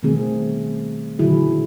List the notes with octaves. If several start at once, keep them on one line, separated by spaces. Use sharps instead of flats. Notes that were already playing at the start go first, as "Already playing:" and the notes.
B2 D#3 G3 A3 C4 G#4
A#2 D3 D#3 F#3 E4 G#4